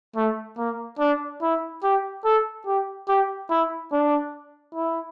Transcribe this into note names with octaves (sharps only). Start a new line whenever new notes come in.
A3
A#3
D4
E4
G4
A4
G4
G4
E4
D4
E4